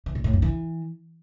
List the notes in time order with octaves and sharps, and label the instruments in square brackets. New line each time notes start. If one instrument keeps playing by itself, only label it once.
[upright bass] E3
A#2
A2
G2
E3